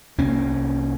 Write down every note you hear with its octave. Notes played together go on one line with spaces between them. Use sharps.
C2 A#3 C#4